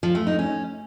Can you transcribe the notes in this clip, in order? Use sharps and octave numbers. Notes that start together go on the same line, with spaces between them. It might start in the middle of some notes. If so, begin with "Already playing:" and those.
F3
A3
D#4
C#4